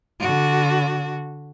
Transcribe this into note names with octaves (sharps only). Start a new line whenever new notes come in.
D3 F#4